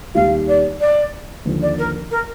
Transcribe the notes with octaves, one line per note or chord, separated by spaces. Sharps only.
D#2 D#3 G3 F5
D5
D5
D#2 D3 F3
D5
A#4
A#4